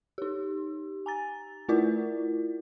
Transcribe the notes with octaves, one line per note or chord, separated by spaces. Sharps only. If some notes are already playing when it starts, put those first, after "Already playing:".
D#4 G4
G#5 A#5 A6
A3 E4 F4 A#4 D5